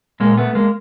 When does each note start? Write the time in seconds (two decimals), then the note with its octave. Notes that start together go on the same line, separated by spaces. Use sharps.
0.20 A#2 G#3 A#3
0.37 A3 B3
0.55 G#3 A#3